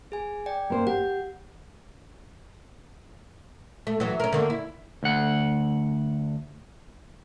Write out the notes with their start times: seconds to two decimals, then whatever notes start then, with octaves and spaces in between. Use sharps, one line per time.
0.12 G#4 G#5
0.46 D5 G5
0.70 A#3 C5
0.87 G4 F#5
3.87 A3
4.00 E3 F#3
4.20 C#4 A#4
4.32 D3 D#3 A#3
4.50 E4
5.03 D2 F#5